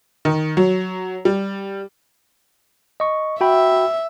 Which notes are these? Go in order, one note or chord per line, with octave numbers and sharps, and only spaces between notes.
D#3
F#3
G3
D#5 C#6
F#4 E5 G5 B5